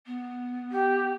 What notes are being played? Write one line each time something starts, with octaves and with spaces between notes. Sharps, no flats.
B3
G4